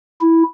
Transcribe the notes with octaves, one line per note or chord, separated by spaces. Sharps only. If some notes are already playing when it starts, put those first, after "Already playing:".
E4